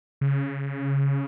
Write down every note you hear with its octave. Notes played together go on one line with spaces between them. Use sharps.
C#3